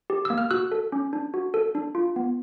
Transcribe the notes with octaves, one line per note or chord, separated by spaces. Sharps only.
G4
A#3 E6
F6
F#4 E6 F#6
A4
C#4
D4
F#4
A4
D4
F4
B3